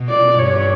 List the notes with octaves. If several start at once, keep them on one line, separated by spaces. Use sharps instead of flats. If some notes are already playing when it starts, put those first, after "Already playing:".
Already playing: B2
D5
G2 C#5